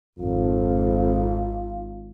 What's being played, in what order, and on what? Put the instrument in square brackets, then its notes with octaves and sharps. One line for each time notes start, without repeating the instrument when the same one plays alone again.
[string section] G#1 [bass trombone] F2 [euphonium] F4